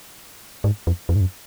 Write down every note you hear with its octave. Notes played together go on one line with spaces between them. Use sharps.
G#2
F2
F2
G#2
F#2